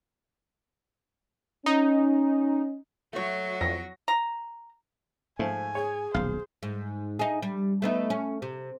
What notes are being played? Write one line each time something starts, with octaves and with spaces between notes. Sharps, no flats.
C#4 D#4
F#3 A3 F#4 C#5
F2 A#6
A#5
G#2 F3 A3 G#5
G#4 C#5
D#1 B1 C5 F5
G#2
D#4 G#4
G3
A3 B3 D#4
C#4
C3